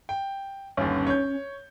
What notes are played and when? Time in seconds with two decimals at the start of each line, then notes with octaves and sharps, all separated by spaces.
0.09 G5
0.77 G1 D#2 C#4
1.07 C#5 G6